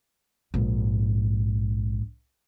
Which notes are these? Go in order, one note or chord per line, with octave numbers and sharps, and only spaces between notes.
A#1 G#2